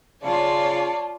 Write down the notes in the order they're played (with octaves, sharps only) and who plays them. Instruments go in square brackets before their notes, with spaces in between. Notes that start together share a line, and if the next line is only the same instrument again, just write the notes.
[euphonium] C#3 [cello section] F4 [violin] C#5 D5 [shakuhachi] A5